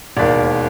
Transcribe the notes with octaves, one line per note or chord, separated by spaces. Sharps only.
E1 D#2 D#3 D5